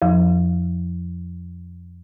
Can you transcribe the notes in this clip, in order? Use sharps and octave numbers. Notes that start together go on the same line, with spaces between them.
F2 F3